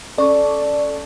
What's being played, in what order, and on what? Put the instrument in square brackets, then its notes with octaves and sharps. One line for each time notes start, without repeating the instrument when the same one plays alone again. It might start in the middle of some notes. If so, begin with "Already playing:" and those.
[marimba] C#4 C#6 [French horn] A4 [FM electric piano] D5